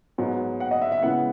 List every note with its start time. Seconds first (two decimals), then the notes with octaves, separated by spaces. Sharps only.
0.18 G#2 F#3 B3 D#4
0.60 F#5
0.71 D#5
0.82 E5
0.92 E5
1.02 C#3 G#3 B3 E4 F#5